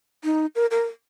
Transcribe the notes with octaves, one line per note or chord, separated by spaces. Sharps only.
D#4
A#4
A#4